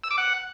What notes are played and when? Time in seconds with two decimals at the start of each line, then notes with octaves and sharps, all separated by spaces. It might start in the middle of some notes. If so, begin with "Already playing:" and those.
0.04 E6
0.11 D6
0.18 F#5